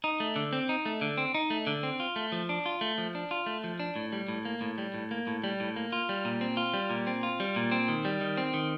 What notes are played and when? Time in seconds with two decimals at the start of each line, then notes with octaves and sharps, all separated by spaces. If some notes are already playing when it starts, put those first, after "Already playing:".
0.04 D#4
0.20 A3
0.36 D3
0.53 C4
0.69 D#4
0.86 A3
1.01 D3
1.18 C4
1.34 D#4
1.50 A3
1.67 D3
1.83 C4
2.00 F4
2.16 A3
2.32 F3
2.49 D4
2.66 F4
2.81 A3
2.98 F3
3.15 D4
3.31 F4
3.46 A3
3.64 F3
3.80 D4
3.96 A2
4.12 G3
4.28 A2
4.45 A#3
4.61 A2
4.78 G3
4.94 A2
5.11 A#3
5.27 A2
5.44 G3
5.60 A2
5.76 A#3
5.92 F4
6.09 G3
6.25 A#2
6.41 C4
6.57 F4
6.74 G3
6.90 A#2
7.07 C4
7.23 F4
7.40 G3
7.56 A#2
7.72 C4
7.88 D#3
8.05 G3
8.21 D#3
8.37 C4
8.54 D#3